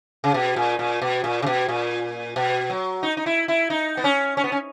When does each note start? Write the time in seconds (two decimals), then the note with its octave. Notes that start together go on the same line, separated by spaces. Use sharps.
0.24 C#3
0.34 B2
0.56 A#2
0.79 A#2
1.02 B2
1.24 A#2
1.42 C#3
1.47 B2
1.69 A#2
2.36 B2
2.70 F#3
3.03 D#4
3.17 D#4
3.26 E4
3.48 E4
3.70 D#4
3.97 B3
4.04 C#4
4.37 C#4
4.44 B3
4.52 C#4